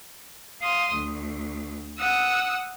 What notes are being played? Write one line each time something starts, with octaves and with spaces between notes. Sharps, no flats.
F5 C6 D#6
D2
F#5 D#6 E6